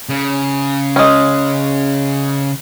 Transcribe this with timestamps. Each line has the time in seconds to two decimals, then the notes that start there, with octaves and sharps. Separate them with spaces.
0.09 C#3
0.96 G#3 C#4